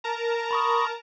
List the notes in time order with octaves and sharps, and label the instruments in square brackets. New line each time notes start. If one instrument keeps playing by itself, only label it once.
[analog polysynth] A#4 A5 A#5
[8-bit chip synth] B5 C#6 D#6